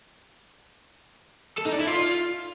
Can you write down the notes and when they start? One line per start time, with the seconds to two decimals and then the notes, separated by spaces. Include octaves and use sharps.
1.58 A4
1.66 D#4
1.73 D5
1.80 E4
1.87 F4